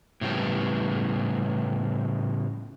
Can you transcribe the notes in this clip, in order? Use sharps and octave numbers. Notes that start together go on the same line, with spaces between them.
A2 C#3 F3 G3 B3